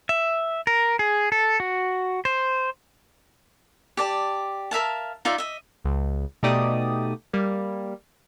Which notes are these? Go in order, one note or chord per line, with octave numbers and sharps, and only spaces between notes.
E5
A#4
G#4
A4
F#4
C5
G4 D5 A5
A#4 E5 F5 A5
D#4 F4 D5 E5
D#5 E5
C#2
B2 A3 D#4 G4 D5 D#6
G3 A#3